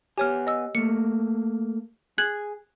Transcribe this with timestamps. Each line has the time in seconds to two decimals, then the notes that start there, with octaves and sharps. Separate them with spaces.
0.18 B3 G4 C#5 G#5 F6
0.47 D#5 E6
0.75 A3 A#3 C#7
2.18 G#4 F#6 G#6 F#7